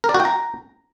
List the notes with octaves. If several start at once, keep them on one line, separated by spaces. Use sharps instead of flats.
A#4
D5
F#4
G5
A#5